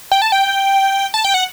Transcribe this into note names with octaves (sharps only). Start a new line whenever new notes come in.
G5
A5
G5
A5
G5
F#5